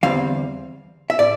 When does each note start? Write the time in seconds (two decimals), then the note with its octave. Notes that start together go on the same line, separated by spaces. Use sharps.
0.03 E2 D3 G3 C4 F5
1.10 E5
1.19 A2 D5